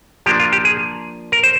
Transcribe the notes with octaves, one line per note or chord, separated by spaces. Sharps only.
F3 A#3 D4 G4
F4
G4
G#4
A#4
C5